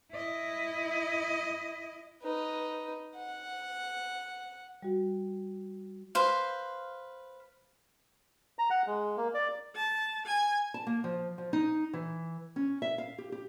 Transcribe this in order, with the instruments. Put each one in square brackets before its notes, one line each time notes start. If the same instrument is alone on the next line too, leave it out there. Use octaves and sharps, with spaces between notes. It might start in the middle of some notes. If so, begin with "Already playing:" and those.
[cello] E4 D#5
[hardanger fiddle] D#4 B4
F#5
[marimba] G3 F#4
[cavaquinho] B4 C5 F5
[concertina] A#5
F#5
G#3
A#3
D5
[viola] A5
G#5
[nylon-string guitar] A5
A#3
F3
F3
D#4
E3
C#4
E5
F5
G4
G4